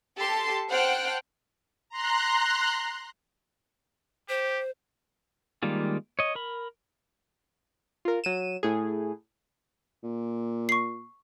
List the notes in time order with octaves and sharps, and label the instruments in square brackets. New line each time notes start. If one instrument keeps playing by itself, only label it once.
[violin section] G4 A4 A5 C6
C5 F#5 G5 A5 F6 F#6
[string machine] A#5 C6 F#6
[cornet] G4 [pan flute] C5
[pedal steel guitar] D#3 G3 G#3 A#3 F4
C#5 D#5
A#4 B5
[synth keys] F4 A#4
F#3 D#7 E7
A2 G#4
[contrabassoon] A#2
[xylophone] C#6 C7